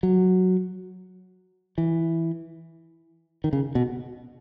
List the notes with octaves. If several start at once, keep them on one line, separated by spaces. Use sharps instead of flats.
F#3
E3
D#3
C#3
B2